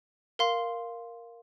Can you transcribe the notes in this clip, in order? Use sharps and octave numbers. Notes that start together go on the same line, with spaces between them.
A#4 F5 C6